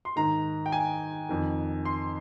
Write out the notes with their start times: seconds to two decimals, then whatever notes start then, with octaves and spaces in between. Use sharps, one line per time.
0.05 C6
0.16 G#2 D#3 A#5
0.66 G5
0.72 G#5
1.29 F2 D#3
1.85 C6